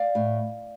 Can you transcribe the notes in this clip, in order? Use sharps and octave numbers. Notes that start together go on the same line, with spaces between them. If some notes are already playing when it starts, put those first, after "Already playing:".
Already playing: D5 F5
A2